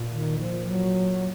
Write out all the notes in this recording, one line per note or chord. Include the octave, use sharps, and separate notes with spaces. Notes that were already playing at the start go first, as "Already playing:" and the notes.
Already playing: A#2
D#3
F3
F#3